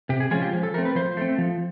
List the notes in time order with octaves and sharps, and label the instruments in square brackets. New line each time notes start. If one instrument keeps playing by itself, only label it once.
[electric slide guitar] C3 G4
G#4
F3 G#3 C#4 F4 G#4
G4
F3
A4
A3 C4 A#4
B4
F3 C5
A3 C4
F3